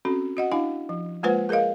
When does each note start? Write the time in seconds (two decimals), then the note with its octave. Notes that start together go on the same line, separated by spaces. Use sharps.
0.05 C4 C#4 F#4 A4
0.37 F#4 D#5 F#5
0.52 D4 E4 F5 G#5
0.89 F3
1.23 G#3 A#3 F4 B4 C5 F#5
1.49 G#4 A#4 C#5 D#5 F5